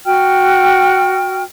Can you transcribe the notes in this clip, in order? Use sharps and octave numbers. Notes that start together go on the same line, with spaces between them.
F#4 G5 F6